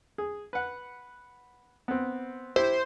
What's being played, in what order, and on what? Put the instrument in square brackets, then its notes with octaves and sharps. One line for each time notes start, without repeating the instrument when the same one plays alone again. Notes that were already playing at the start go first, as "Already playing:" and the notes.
[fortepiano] G#4
B4 F#5
B3 C4
[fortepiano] E4 G4 E5 [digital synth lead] C5